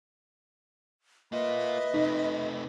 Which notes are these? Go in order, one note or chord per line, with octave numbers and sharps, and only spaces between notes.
A#3 F4 B4 D#5 E5
C3 A3 D#4